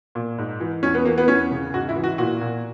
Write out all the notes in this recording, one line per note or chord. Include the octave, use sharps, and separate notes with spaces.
A#2
G#2
E3
E2 C#4
B3
E3 A#3
B3
E2 C#4
C#3
G#2 F#4
E4
E3
F#4
A#2 F#4
A#2